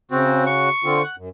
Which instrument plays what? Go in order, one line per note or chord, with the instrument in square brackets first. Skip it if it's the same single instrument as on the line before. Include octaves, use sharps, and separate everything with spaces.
[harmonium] C#3 F#4 [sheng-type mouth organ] C4
[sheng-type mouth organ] C#6
[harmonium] D3 C4 F4
F#5
F#2